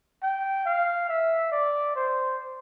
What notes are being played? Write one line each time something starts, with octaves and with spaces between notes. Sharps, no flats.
G5
F5
E5
D5
C5